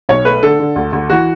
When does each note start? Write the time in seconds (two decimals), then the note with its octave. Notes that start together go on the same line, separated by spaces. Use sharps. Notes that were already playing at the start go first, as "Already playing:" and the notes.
0.09 B1 C#5
0.25 A3 B4
0.43 D3 A4
0.59 D3
0.76 D2
0.93 D2
1.10 E3 F#4